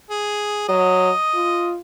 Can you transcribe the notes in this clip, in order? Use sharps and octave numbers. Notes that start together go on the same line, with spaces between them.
G#4
F#3 D#5
F4